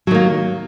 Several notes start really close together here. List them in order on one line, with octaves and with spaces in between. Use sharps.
F#3 D#3 A#3